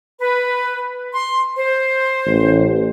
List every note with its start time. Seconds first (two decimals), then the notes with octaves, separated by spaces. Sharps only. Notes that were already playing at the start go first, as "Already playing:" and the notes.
0.20 B4
1.13 C6
1.56 C5
2.26 A1